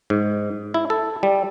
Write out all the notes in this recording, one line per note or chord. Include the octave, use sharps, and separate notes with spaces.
G#2
E4
A4
G3